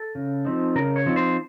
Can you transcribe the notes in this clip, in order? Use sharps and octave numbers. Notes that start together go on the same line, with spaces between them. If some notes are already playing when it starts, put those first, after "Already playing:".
Already playing: A4
C#3
F3 C4 D#4
C#3 A#4
C#5
F3 C4 D#4
C5